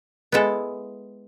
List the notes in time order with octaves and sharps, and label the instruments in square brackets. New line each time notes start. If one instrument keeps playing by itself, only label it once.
[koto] G#3 B3 E4 A4